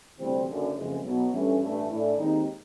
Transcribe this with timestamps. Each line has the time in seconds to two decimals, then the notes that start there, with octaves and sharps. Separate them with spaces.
0.18 D2 C3 E3 G3 C4
0.46 F#1 F#2 D3
0.75 F#1 F2 C#3 E3 G#3
1.02 B1 B2 F#3
1.32 G2 E3 A3 C#4
1.60 A1 G2 E3 A3
1.89 A2 E3 A3 D4
2.17 D#2 D#3 G#3 C4 D#4